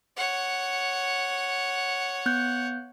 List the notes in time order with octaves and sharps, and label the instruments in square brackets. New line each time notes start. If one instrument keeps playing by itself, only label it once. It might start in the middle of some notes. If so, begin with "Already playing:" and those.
[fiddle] C#5 F#5
[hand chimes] B3 F#6 G6